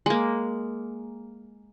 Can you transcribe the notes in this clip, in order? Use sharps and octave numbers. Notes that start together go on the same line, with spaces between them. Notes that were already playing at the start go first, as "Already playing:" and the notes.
G#3 A#3